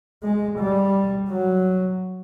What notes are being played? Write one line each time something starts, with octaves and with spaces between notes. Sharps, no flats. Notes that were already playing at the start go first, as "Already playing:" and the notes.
G#3
G3
F#3